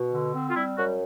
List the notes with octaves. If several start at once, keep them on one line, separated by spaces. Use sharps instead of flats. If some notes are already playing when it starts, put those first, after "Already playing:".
Already playing: B2
D3
C4
F4
G3 E4
F#2 F#4